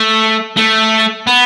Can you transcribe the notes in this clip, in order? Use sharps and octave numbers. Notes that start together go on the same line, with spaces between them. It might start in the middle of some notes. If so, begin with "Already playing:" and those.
Already playing: A3
A3
B3